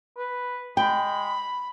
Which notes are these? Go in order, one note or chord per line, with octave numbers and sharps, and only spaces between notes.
B4
G#3 G5 B5